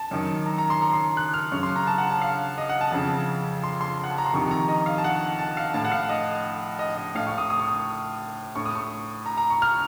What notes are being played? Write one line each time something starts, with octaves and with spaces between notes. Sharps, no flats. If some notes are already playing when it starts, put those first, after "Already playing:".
Already playing: A5
F#2 D#3
A#5
A#5
C6
A#5
C6
F#6
F6
F#2 C#3 C#6
C6
A#5
A5
F#5
A5
F5
D#5
F#5
A5
F2 C#3 A5
C6
C6
F#5
A5
A#5
C6
F2 C3 D#3 C#6
A#5
D#5
F5
A5
F#5
A5
F5
A2 A5
F#5
F5
D#5
D#5
D#5
A2 F5
C#6
D#6
D#6
C#6
D#6
A2 C#6
D#6
C#6
A#5
A#5
C#6
F6